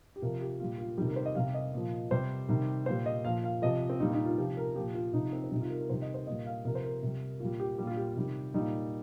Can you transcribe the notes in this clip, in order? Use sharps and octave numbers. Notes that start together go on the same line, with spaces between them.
G4
C3 F3 A#4
G4
A#2 G3 F4
F4
C3 D#3 G3 G4
A#4
C5
D#5
C3 G3 F5
D#5
A#2 F3
C3 G3 C5
C3 D#3 G3
A#2 G3 C5
D#5
A#2 F3 F5
F5
C3 F3 D#5
C4
A#2 G3 D#4
D#4
F4
C3 F3 G4
A#4
A#2 F3 G4
F4
C3 F3 D#4
C4
C4
C3 G3 D#4
F4
A#4
A#4
C3 D#3 G3 C5
D#5
C5
A#2 G3 D#5
F5
C3 F3 A#4
C5
A#4
C3 G3
A#2 G3 F4
G4
A#2 G3 G4
F4
G4
C3 D#3 G3
A#2 G3 D#4